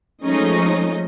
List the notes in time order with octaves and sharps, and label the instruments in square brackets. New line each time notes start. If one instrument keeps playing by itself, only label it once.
[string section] F3 G#3 A3 C#4 D#4 D#5